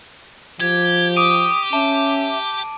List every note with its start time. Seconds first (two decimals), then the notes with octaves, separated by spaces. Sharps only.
0.60 F3 G4 G#6
1.16 D6 D#6 D7 D#7
1.73 C#4 E5 A5 D7